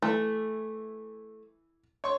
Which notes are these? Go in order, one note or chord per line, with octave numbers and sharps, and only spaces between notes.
E3 A3
C#5 C6 C#6